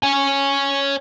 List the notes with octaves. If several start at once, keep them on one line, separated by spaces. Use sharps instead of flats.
C#5 G#5